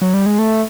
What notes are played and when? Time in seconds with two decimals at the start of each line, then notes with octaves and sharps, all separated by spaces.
0.02 F#3
0.14 G3
0.26 G#3
0.39 A3